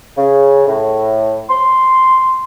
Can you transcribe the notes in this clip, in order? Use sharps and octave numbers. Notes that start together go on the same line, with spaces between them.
C#3
A2
C6